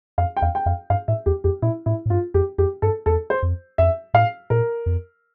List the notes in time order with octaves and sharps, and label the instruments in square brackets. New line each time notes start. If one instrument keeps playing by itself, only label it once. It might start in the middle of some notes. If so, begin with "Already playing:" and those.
[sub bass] F2 [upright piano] F5
[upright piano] G5
[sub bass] E2 [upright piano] F5
[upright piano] G5
[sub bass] F2 [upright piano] F5
[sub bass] G2 [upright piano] F5
[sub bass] A2 [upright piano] E5
[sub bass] E2 [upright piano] G4
[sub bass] F2 [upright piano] G4
[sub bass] A#2 [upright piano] E4
[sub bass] A2 [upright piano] E4
[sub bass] A2
[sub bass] G2 [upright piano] F4
[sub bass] F2 [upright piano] G4
[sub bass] F2 [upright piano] G4
[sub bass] G2 [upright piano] A4
[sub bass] E2 [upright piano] A4
[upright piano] C5
[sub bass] F2
[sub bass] F2 [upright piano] E5
[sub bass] A2 [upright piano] F5
[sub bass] A#2 [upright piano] A#4
[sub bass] F2